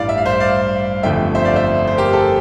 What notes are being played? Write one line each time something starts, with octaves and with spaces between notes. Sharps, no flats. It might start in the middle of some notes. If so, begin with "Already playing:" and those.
Already playing: A1 G2 E3 G3 D5 F5
E5
F5
C5 E5
D5 F5
G1 F2 D3 A3 E5 G5
C5 E5
D5 F5
C5 E5
C5
G4 A#4
A4